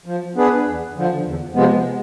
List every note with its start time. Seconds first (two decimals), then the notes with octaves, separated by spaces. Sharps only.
0.06 F3
0.35 B3 D4 G#4 B4
0.66 E2
0.95 D3 F3
1.24 E2
1.54 C3 F3 G#3 B3